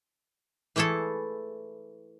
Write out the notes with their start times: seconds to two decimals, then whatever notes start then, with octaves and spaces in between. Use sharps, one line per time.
0.76 E3 A3 E4 G#4 A4